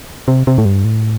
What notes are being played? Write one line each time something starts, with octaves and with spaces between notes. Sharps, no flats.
C3
C3
A2
G2
A2